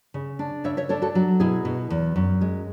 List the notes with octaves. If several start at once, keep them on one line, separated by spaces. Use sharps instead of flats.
C#3
D4
C#3 C#5 E5
C#5 E5
D4 A4 C#5
F#4 A4
F#3
B2 E4 G#4
B2
E2
F#2
G#3